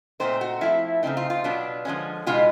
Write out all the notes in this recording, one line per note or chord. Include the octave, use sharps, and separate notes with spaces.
A#2 F#3 A3 C4 D#4 C5
F#4
F3 A3 C4 E4
C#3 F3 A3 C4 D#4
F4
F4
B2 F#3 B3 D4
D3 F3 G#3 C#4
B2 G#3 B3 D#4 F4